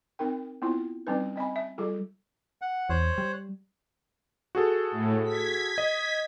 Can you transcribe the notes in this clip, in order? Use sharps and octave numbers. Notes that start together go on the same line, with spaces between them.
C4 D#4 A#4 G5
B3 C4 E4 F4
G3 C4 C#4 D#4 B4
C4 D#5 G#5 B5
E5
G3 F4 G#4 A4
F#5
E2 C5 C#5 F#6
G3
F#4 G#4 A4
A2
G#6 B6
D#5